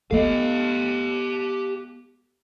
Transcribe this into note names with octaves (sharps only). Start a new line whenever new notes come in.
G#3 B3 G4 A4 D#5 F5